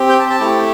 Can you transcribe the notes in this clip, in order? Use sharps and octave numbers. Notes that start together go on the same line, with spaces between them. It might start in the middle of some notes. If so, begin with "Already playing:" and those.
Already playing: C4 G4
G5
A5
A5
A3 E4 G4